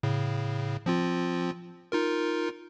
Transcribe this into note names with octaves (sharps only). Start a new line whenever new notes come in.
A2 C#3
F3 C4 F4
D#4 F4 A#4